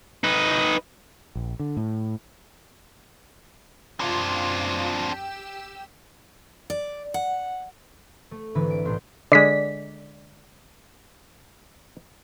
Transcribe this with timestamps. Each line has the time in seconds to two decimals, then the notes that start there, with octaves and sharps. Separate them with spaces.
0.24 D#4 B4
1.36 A#1
1.60 D3
1.77 A2
4.00 F#2 C4 D4 F4 D#6
5.11 G4 E6
6.70 D5
7.14 F#5
8.31 A3
8.55 G#1 D3 E3 B4
8.71 D7
8.85 B1 A2 D4 G4 C6 G6
9.32 D3 G#3 D5 B6